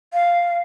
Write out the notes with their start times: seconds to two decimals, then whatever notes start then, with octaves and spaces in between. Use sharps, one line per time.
0.13 F5